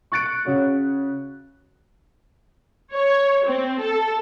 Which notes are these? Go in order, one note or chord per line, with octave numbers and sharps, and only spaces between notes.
C#6 F#6 A6 C#7 D7
C#3 F#4 C#5
C#5
C4
A4